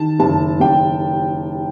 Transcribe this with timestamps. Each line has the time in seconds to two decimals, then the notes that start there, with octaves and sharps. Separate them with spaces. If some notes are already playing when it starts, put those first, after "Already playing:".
Already playing: D#3 A5
0.19 F#1 A5
0.60 F#1 G5